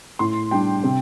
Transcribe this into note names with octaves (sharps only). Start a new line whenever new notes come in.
A2 C6
G3 D4 G5
C3